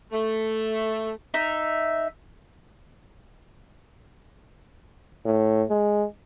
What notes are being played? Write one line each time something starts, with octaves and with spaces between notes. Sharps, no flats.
A3
D#4 E5
A2
G#3